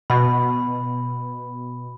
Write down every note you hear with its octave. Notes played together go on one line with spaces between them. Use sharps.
B2 B5